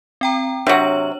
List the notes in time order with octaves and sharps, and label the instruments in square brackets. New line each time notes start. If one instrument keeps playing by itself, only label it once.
[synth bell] C4 G5 A#5
[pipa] C3 F#3 [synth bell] D4 C#5 F#7